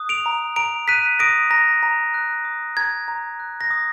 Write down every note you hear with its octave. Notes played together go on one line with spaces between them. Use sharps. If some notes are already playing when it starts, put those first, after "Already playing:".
Already playing: D#6 F#6
D7 F7
A#5
A#5 D7 F7
F#6 B6 D#7
D#6 A#6 D7
A#5 A#6
A#5
F#6
D#6
A#5 G#6
A#5
F#6
A#6
D#6